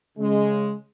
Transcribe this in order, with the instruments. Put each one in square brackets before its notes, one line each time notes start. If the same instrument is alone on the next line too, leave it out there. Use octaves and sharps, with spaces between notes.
[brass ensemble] C#3 G#3